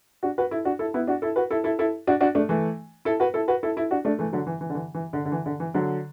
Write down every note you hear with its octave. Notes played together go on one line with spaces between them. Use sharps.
D4 F#4
F#4 B4
E4 A4
D4 F#4
E4 A4
B3 E4
D4 F#4
E4 A4
F#4 B4
E4 A4
E4 A4
E4 A4
D4 F#4
D4 F#4
A3 D4
E3 A3
E4 A4
F#4 B4
E4 A4
F#4 B4
E4 A4
E4 A4
D4 F#4
A3 D4
E3 A3
D3 F#3
E3
E3
D3
E3
E3
D3
D3
E3
D3
E3
D3 F#3